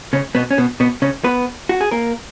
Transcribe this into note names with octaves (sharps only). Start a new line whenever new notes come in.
C#3 C#4
B2 B3
C#4
B2 B3
B2 B3
C#3 C#4
B3 B4
F#4
G#4
A#3 A#4